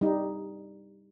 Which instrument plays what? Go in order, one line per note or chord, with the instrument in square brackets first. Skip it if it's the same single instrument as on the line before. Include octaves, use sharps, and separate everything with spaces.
[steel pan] G3 D#4